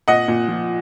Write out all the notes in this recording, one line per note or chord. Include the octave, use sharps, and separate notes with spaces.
A#2 D#5 F#5
A#2
F3